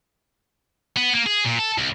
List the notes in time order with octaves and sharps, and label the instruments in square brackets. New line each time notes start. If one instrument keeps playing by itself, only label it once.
[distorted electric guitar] B3
A#3
G#4
A#2
A4
C2